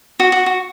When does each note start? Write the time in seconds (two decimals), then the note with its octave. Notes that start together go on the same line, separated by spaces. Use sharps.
0.20 F#4
0.32 F#4
0.46 F#4